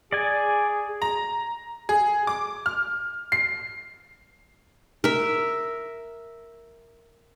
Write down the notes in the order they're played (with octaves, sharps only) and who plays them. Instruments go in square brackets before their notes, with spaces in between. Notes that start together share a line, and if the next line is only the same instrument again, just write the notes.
[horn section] G#4 [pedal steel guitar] D5 G#5
[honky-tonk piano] A#5
G#4
D6
F6
C7
[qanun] A#4 E5